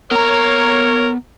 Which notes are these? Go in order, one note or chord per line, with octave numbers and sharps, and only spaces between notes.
A#3 B3 A#4 C#5 A#5